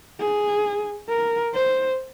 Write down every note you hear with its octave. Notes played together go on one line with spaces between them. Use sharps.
G#4
A#4
C5